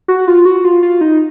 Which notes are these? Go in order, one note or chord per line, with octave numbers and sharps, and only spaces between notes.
F#4
F4
F#4
F4
F4
D#4